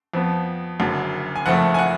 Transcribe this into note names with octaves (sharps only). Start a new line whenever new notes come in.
F2 F3 B3
F#1 F#2 D3
G#5
F#1 F2 F3 A3 F#5
G#5
F#5